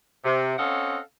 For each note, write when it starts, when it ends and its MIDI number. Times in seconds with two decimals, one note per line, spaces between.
0.24 0.54 48
0.59 0.99 60
0.59 0.99 61
0.59 0.99 69
0.59 0.99 75
0.59 0.99 77
0.59 0.99 78